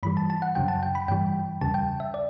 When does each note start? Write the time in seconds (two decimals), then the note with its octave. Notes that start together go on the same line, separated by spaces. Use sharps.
0.03 G2 E3 G3 B5
0.17 A5
0.30 A5
0.42 F#5
0.55 F#2 C#3 F#3 G5
0.68 A5
0.83 G5
0.95 B5
1.08 G2 E3 G3 G5
1.61 E2 C#3 G3 A5
1.74 G5
2.00 E5
2.14 D5